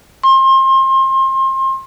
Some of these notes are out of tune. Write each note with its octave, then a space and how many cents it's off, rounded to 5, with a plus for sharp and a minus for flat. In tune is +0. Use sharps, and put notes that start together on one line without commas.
C6 +30